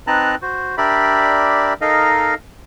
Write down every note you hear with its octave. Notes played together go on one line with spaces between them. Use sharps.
C4 D#4 B4 A5 A#5 F#6
F#4 C5
D4 G4 A#4 D5 E5 B5
D#4 A4 A#4 D#5 F5